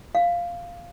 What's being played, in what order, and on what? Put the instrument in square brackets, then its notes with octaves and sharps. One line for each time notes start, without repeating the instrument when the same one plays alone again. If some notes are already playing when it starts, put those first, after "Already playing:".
[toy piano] F5